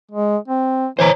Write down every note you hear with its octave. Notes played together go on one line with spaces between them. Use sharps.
G#3
C4
E3 C5 C#5 A#5